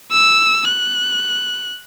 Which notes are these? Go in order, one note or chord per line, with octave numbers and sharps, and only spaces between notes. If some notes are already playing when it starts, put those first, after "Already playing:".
E6
F#6